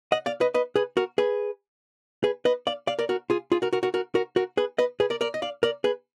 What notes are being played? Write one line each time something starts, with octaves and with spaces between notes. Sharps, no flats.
D#5 F#5
D5 F5
B4 D#5
B4 D#5
G#4 B4
F#4 A#4
G#4 B4
G#4 B4
B4 D#5
D5 F5
D5 F5
A#4 D5
F#4 A#4
F4 G#4
F4 G#4
F#4 A#4
F#4 A#4
F#4 A#4
F#4 A#4
F#4 A#4
F#4 A#4
G#4 B4
B4 D#5
G#4 B4
A#4 D5
A#4 D5
D#5
D5 F5
A#4 D5
G#4 B4